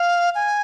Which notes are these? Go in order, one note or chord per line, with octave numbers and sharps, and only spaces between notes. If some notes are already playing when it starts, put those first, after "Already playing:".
Already playing: F5
G#5